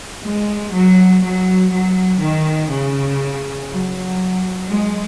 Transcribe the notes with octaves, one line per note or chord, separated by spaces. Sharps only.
G#3
F#3
F#3
F#3
D#3
C#3
F#3
G#3